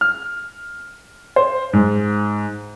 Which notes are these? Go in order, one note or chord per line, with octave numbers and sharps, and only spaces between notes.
F6
C5
G#2